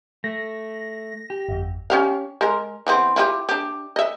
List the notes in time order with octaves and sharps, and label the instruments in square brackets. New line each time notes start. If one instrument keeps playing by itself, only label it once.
[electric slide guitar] A3 [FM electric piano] A#6
[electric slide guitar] G4
[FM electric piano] G1 F2
[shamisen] C#4 G4 F5
G#3 A#4
E3 B3 C4
E4 F4 G4
D4 G4
D#5 E5